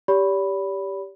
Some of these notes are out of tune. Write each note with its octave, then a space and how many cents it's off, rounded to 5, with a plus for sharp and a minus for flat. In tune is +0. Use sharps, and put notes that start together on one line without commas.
G4 +0 D5 -45 B5 +0